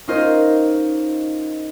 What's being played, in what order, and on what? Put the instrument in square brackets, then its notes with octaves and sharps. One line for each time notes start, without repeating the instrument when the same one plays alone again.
[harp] C#4 D#4 F4 A#4 C5 D#5